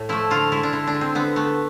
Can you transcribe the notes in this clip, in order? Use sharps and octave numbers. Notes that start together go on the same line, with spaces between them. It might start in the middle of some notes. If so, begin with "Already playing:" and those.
Already playing: A2
F3 A3 E4
D3 F4
G#3 E4
D4
D3 E4
D4
G#3
C4
D3 B3
A3 B3